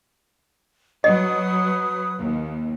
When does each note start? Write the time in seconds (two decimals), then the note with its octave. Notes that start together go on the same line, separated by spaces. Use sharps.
1.04 F#3 B4 D#5 D#6
2.19 D#2